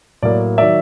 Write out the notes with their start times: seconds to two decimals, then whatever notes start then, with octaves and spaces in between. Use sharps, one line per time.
0.22 A2 F#3 A#3 D5
0.58 D#3 F#3 D5 E5